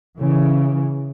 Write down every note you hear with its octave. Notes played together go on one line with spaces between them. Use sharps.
C#3 E3